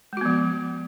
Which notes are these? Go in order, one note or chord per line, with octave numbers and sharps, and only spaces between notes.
F3 G#3 B3 F#4